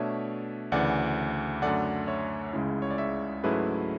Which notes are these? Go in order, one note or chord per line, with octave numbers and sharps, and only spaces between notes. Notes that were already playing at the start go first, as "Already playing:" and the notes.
Already playing: B2 A3 D4 C#5 E5
D2 C#3 E3 D5 F#5
F#2 D3 A3 D5 F#5
C#5 E5
C#2 C#3 G#3 C#4 E4
C#5
D5
C#5 E5
G#2 F#3 A3 C#4 E4 G#4 B4